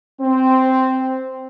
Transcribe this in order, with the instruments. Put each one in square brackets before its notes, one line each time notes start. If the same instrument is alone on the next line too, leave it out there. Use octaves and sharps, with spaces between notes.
[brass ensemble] C4